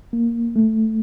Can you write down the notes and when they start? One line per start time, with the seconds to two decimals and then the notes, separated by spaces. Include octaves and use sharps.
0.13 A#3
0.56 A3